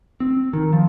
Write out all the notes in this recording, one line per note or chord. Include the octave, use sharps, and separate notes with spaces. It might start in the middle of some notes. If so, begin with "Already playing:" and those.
C4
D#3
F3